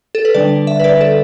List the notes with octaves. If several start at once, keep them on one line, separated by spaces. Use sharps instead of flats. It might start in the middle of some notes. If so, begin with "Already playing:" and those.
A4
B4
D3 G3 D4 D5
E5
B4
D5
A4